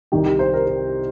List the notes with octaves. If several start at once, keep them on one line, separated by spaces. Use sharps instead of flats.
C2 C3 D#3 G4
G4
C5
A#4
A#4